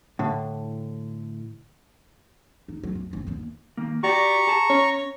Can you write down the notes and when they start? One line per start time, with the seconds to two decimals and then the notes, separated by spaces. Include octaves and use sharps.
0.19 A2 D3
2.68 D#4
2.83 F#3
2.95 F#2
3.13 G1
3.27 G1 D#2
3.77 D#3 A#3
4.03 F#4 G4 D5 A#5 C#6
4.47 G#4 A5
4.70 C#4 C#5